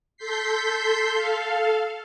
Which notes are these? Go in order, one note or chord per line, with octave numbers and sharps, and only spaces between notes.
A4 C6 G6 B6 C7
A4 F5